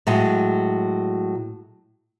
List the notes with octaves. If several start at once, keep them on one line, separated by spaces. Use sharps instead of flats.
A2 F#3 G#3